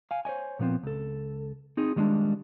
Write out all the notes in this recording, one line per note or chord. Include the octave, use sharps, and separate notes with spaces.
F5 G#5
C5 C#5 D#5 G#5
A#2 F3 B3 C4
C#2 A4
C4 D#4 G#4
D#3 G3 G#3 C4 D4